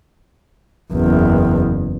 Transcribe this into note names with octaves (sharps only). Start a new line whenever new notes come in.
F#1 E2